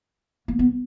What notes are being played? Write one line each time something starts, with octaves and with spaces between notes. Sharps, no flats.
A#3
B3